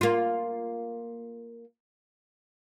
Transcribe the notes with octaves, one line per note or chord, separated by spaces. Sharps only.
A#3 F4